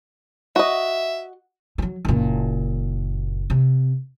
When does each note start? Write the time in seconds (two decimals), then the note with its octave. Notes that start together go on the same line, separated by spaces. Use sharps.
0.56 F#4 D#5 E5
1.78 F3 F#3
2.05 F#1 A#2
3.50 C3